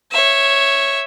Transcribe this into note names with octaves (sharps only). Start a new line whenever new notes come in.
C#5 E5